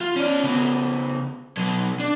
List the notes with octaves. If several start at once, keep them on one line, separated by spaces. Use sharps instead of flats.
F4
C#4 D5
C#3 B3
B2 F#3
D4